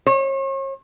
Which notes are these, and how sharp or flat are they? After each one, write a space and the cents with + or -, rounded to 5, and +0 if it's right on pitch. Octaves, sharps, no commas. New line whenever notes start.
C#5 -40